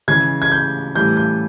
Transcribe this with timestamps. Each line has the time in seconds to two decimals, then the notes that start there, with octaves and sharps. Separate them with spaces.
0.08 C#3 E3 G#3 G#6
0.42 G#6
0.52 G6
0.95 A2 E3 G3 G6
1.17 G6